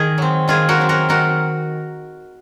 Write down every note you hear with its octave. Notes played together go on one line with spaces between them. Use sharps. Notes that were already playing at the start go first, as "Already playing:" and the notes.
Already playing: D#3 G#4 A#4
F#3 C4
D#3 F4 G#4
F#4 A#4
F#3 C4
F#4 A#4
D#3 F#4 A#4